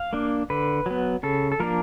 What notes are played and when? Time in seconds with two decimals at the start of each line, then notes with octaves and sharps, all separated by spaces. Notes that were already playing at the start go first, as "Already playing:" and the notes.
Already playing: F5
0.13 A#3 D4
0.50 D3 B4
0.86 F#3 B3
1.23 C#3 A4
1.52 A4
1.60 F3 A#3 D4 A#4